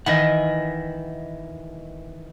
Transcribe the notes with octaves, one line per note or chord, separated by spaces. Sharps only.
D#3 E3 D#5 E5 F#5